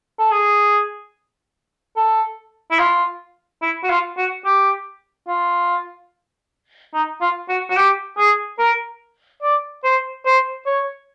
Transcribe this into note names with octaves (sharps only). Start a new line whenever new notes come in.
A4
G#4
A4
E4
F4
E4
F#4
F4
F#4
G4
F4
D#4
F4
F#4
F#4
G4
G#4
A#4
D5
C5
C5
C#5